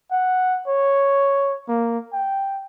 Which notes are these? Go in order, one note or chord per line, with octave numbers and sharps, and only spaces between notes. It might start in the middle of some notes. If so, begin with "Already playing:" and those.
F#5
C#5
A#3
G5